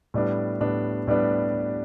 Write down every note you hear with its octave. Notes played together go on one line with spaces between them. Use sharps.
A2 G3 B3 D4
A2 G3 B3 D4
A2 G3 B3 D4